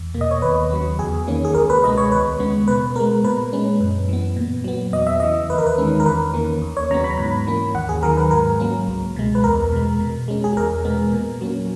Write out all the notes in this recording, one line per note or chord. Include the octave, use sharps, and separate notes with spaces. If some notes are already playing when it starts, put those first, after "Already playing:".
Already playing: E2
B2 A#3
D#5
C#5
D#2 B4
C#3 F#3 B3
E2 G#4
D#3 A#3 C#4
G#4
C#2 A#4
B4
B2 G#3 B3 D#5
C#5
D#2 B4
C#3 G#3 B3
B2 B4
G#3 B3 A#4
A#2 B4
G#3 C#4
F#2
E3 B3
A#2
F#3 B3
E2 D#5
E5
C#3 E3 D#5
D#2 B4
A#4
B4
D#3 G#3 C#4
A#4
E2 B4
D#3 A#3 C#4
D#2
C#5
C#3 F#3 B3 A#5
B5
G#2 B5
E3 A#3 C#4
D#2 F#5
G#4
D#3 F#3 A#4
B4
G#2 A#4
F#3 A#3 C#4
C#2
B2 G#3
B4
E2 A#4
B2 G#3
B2
G#3 C#4
G#4
E2 A#4
B2 G#3 B3
A#2
F#3 A#3 C#4